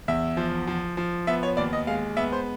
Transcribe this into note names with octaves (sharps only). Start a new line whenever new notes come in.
E2 E5
F3
F3
F3
B3 E5
C#5
D#2 D5
D#5
G#3 F5
B3 E5
C5